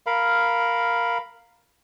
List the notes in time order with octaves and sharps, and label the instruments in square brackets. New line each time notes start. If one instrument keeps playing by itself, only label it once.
[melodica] A#4 F5 B5